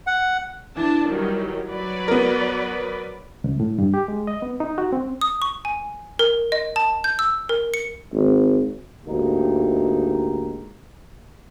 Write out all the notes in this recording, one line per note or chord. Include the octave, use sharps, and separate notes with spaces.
F#5
E3 D4 A5
D#3 F#3 G3
F#3 B4 D5
B3 A#4
C#2
A2
G2
G4
G#3
D#5
B3
D#4
F#4
C4
D#6
C#6
G#5
A#4
D#5
A5
G6
E6
A#4
C#7
G#1
D2 G#2 A#3 D#4 G4